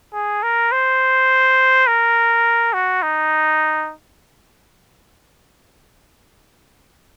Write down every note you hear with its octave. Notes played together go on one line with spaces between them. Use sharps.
G#4
A#4
C5
A#4
F#4
D#4